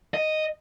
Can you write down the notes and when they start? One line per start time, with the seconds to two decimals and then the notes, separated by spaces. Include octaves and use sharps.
0.14 D#5